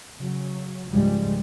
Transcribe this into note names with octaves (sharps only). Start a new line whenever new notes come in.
C#3 F#3
C#2 G#2 C#3 F3 G3 G#3